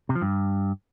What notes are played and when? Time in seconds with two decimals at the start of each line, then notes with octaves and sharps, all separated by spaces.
0.09 C3
0.15 F3
0.22 G2